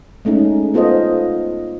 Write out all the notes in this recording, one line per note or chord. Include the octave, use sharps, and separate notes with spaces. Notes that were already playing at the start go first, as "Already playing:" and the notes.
G#3 A3 C#4 D#4
B3 F4 A4 C5 D#5